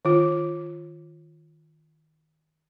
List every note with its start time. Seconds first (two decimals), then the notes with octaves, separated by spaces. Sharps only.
0.05 D#3 F4